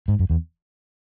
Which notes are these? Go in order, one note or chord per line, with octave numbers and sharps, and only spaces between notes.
G#2
F#2
E2